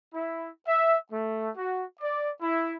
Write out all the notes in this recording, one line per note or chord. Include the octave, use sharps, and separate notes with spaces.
E4
E5
A3
F#4
D5
E4